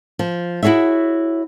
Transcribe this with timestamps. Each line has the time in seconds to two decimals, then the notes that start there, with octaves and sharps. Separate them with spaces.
0.19 F3
0.63 E4 F#4 G#4 C#5 E5